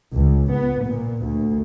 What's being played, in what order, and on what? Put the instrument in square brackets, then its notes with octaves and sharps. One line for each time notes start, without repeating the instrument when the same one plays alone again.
[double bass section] C#2
B3
A#2
D2